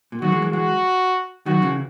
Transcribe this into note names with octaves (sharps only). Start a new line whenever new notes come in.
A#2
D#3 F#3 F#4
E3 G#3
E3 G#3
E3 G#3 F#4
D#3 F#3 F#4
C#3 E3